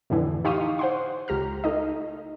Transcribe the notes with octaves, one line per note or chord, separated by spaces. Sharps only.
F2 A2 D3 E3
D#4 G4 F5 C6 C#6 D#6
C5 F#5 C6
C#2 G4 A#5 F6
A3 D#4 D#5